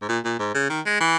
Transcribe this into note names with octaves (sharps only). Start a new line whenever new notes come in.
G#2
A#2
A#2
G#2
C#3
D#3
G#3
E3